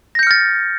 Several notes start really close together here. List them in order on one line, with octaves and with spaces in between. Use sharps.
A#6 G6 C#7 F6 A6